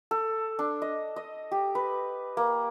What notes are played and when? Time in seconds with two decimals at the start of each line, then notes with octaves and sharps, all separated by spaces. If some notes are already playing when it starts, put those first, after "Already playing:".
0.11 A4
0.59 D4
0.82 D#5
1.16 D#5
1.52 G4
1.75 B4
2.37 A#3